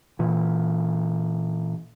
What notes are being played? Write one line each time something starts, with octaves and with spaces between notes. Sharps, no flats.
A#2 E3